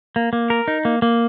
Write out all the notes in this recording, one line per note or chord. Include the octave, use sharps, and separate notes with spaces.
A#3
A#3
A#4
D#4
A#3
A#3